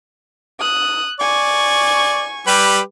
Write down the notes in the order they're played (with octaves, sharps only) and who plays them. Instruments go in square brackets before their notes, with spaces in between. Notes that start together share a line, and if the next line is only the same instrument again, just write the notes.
[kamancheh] D#6 F#6
[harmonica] D5 [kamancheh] G#5 C#6
[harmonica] G3 G4 B4